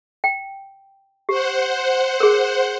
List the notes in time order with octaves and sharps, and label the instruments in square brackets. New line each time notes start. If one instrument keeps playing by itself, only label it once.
[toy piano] G5
[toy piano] G4 [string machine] C5 F#5
[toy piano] G#4 A#4